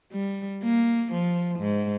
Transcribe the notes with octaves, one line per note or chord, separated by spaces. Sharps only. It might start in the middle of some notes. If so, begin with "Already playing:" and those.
G3
A#3
F3
G#2